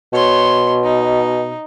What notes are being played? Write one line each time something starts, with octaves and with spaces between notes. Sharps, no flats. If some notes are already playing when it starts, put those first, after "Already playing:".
B2 C#5 C6
D#4